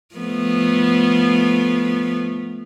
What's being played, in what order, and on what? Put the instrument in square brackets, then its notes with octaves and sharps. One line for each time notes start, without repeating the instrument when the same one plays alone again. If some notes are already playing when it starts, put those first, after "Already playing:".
[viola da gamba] F3 A3 B3